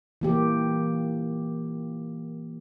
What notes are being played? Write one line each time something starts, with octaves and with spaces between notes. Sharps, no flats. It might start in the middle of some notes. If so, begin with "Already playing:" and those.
E3 A#3 G4